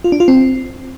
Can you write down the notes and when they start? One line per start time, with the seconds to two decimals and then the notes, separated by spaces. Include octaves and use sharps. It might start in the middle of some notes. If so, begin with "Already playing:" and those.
0.04 F4
0.12 D4
0.20 F4
0.28 C4